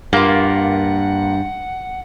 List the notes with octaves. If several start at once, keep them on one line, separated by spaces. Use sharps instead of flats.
G2 A#3 F4 F#5